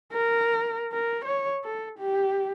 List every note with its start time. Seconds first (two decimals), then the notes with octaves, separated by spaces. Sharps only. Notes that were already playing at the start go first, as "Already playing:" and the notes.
0.13 A#4
0.93 A#4
1.24 C#5
1.64 A4
1.98 G4